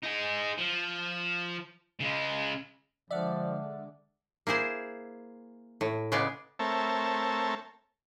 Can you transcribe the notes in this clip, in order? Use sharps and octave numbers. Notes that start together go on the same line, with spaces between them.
D#4 G#4
F3
C#3 G#3
D3 F3 G#3 D5 E5 F#5 F6
A#3 E4 G#4 C5
A2
C#3 G#3 B3 D5
A3 C4 A#4 C#5 E5 A5